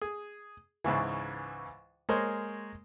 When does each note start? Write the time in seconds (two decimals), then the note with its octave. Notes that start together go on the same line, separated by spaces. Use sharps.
0.02 G#4
0.84 C#2 G#2 C#3 E3
2.09 G#3 A#3 A#4 C5 C#5